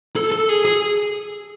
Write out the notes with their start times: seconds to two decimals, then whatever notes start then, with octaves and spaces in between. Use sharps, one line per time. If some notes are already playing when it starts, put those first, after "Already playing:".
0.16 A4
0.32 A4
0.49 G#4
0.65 G#4